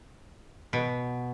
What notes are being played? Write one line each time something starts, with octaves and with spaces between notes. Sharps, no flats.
B2